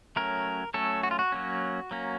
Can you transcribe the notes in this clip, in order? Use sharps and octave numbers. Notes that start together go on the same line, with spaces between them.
F#3 A3 C#4 A#4
F#3 A3 C#4 A4
F#4
F4
F#4
F#3 A#3 C#4
F#3 A#3 C#4